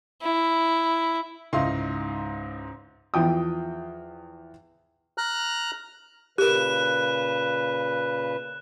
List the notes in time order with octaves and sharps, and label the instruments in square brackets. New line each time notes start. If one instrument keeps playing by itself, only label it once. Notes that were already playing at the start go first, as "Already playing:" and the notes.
[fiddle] E4
[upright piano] C#2 G#2 D#4 E4 F5 C6
[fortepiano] E2 F3 G5 D#6
[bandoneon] A#5 F6 F#6
[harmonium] A#2 C#3 B4 [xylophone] G4 A#4 [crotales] F#6 E7